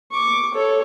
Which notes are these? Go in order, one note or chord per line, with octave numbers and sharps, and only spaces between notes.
C#6 D6
A4 C#5